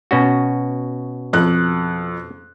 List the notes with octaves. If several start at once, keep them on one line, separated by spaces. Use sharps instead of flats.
B2 C#4 F#4
F2 F#6